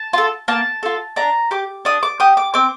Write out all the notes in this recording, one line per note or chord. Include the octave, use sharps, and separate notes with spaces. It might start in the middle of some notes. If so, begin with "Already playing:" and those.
Already playing: A5
F4 A4
A#3 A5
F4 A4
D4 A#5
G4 D6
D4 D#6
D6
G4 D#6
D6
C4 D6